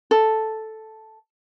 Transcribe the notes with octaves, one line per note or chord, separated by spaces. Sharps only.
A4